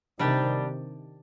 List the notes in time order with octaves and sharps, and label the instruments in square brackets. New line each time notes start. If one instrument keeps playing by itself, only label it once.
[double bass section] C3 D#3 [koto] G3 D4 G4